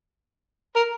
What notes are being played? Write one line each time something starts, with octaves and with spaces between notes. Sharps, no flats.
A#4